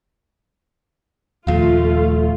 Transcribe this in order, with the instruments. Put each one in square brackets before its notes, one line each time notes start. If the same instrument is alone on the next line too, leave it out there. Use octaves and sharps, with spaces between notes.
[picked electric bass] D#1 D#2 F3 [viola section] A3 F4 [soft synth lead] F5